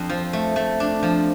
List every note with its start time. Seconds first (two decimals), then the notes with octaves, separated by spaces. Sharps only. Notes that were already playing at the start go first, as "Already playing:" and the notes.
Already playing: F2 D4
0.10 F3
0.33 A3
0.56 A3
0.80 D4
1.03 F3